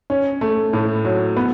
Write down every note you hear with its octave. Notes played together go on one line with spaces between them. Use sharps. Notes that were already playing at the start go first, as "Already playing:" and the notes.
C#4
A3
A2
F#3
B3